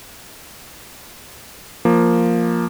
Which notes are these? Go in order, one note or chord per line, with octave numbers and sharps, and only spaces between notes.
F3 A#3